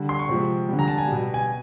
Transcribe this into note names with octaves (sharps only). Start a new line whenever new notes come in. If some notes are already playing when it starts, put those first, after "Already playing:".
Already playing: D3 G3
C6
C#6
C3 F3 G#3
D3 G3
A#5
A5
G#5
B2 G3
G#5